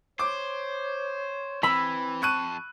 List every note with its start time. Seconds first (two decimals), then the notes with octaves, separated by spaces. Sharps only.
0.19 C5 C#5 D6
1.63 E3 C4 B5 E6
2.22 F2 A5 C#6 F#6 D#7